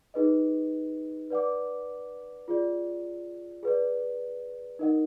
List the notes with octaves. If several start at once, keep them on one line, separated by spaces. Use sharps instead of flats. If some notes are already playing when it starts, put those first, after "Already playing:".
D#4 G#4 B4 D#5
B4 D5 F#5 D6
F4 G#4 D5
G#4 B4 D5
D#4 A#4 D#5 F#5